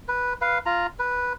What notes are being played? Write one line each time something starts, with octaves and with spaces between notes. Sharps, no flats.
B4
B4 F5
F4 A#5
B4